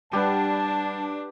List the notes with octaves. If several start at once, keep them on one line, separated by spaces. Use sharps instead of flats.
G3 D4 G4 B4 F#5 A5